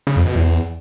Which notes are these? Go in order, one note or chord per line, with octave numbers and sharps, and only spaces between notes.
C#3
F2
B2
E2